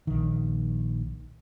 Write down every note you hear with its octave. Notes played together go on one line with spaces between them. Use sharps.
A#1 D#3